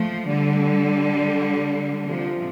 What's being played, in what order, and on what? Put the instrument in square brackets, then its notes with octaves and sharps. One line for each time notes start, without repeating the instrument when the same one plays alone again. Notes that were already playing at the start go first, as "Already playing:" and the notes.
Already playing: [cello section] F3 A3
D3 G3
C3 F3